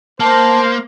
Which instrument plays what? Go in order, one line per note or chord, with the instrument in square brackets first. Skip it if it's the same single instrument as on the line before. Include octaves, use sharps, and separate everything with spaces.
[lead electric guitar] A#3 [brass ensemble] C5 [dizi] A5